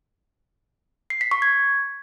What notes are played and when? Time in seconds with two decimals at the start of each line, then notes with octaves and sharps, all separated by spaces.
1.10 C7
1.21 B6
1.31 C#6
1.42 G#6